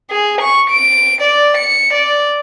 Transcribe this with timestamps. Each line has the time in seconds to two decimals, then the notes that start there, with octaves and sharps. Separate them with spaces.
0.10 G#4
0.41 C#6
0.70 D7
1.21 D5
1.57 C#7
1.94 D5